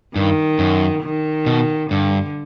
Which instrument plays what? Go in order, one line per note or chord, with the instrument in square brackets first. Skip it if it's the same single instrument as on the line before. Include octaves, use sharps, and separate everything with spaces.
[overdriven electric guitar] G2 [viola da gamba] D#3
[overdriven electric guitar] F#2
[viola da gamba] D#3
[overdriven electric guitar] B2
[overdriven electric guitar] G2 [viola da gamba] D3